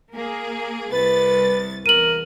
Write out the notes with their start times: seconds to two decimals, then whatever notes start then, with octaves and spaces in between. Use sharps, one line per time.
0.14 A#3 G#4
0.93 C2 B4 A6
1.86 E2 A#4 D#7 F#7